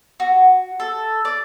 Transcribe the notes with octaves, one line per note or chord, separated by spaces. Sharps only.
F#4
A4
D5